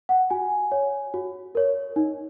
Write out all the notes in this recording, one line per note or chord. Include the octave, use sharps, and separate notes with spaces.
F#5
F#4 G#5
C#5
F#4
A#4 C#5
D#4